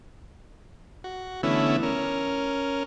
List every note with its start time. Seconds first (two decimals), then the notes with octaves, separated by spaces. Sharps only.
1.04 F#4
1.43 D3 E3 A3 B3 C#4 E4
1.83 C#4 A#4